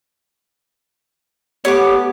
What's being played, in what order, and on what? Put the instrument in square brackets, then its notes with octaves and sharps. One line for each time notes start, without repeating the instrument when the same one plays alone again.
[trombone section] A3 B3 [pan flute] G4 [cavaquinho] C#5 D6